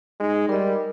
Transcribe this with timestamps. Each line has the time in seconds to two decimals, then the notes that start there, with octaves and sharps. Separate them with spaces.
0.20 G#3 D#4
0.49 G3 A#4 D#5